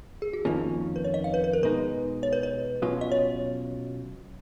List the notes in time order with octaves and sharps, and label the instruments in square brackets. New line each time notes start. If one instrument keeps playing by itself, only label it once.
[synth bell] G#4
F#4
[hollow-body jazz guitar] F2 D#3 A#3 C#4 [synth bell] F4
[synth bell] B4
C#5
D#5
F5
B4
B4
A#4
[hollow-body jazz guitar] B2 G#3 D#4 [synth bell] B4
[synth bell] C#5
B4
B4
[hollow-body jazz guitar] B2 F#3 C#4 F4
[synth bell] D#5
C#5